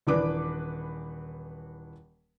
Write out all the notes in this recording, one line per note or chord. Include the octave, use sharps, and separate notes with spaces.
D#1 E3 D4 B4 D6